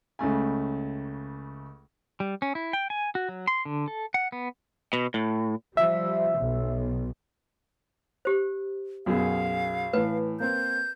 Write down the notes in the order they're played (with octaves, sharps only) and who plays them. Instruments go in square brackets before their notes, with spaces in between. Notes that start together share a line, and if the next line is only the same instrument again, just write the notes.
[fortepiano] C#2 C#3 A3 G#5
[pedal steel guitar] G3
C#4
E4
G5
G#5
F#4
F#3
C6
D3
A4
F#5
B3
[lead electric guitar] B2
A2
[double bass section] F3 G3 [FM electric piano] E5
[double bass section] B1
[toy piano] G4 C5
[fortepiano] B1 F#2 G#4 [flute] F5
[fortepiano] A2 E3 [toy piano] B4
[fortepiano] A#3 C4 [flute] G6